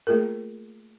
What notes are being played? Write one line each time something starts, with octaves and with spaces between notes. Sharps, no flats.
A3 A#3 F4 G#4 A#4